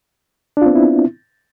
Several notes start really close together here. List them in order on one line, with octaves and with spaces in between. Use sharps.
D4 F4 C4 B3 E4